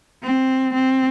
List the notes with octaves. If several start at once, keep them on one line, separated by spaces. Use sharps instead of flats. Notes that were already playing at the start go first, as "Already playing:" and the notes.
C4
C4